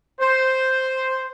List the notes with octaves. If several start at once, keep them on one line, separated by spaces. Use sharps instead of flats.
C5